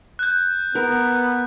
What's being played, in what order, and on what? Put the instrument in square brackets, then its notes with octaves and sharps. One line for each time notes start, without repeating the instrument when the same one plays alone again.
[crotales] F#6 G6
[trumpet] B3 [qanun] A#4